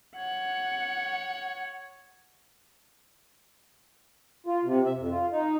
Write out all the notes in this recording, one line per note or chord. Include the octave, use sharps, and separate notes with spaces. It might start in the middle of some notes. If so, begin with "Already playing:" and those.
C#5 F#5
F4
C3
E5
F2
F4
D#4